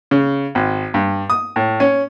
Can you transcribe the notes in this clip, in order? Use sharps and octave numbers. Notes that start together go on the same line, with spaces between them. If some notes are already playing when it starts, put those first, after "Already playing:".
C#3
G#1
G2
D#6
A2
C#4